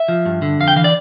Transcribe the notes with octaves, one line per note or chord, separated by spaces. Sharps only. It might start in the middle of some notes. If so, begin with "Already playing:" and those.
Already playing: E5
F3
G2
D3
F2 F5
G5
E3 F5
D5